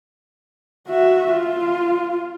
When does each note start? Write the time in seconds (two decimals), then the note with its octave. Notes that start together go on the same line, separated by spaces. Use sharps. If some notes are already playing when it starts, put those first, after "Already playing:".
0.88 F#4 E5
1.31 F4